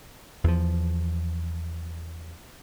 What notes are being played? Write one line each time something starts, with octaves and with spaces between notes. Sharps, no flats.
E2 F3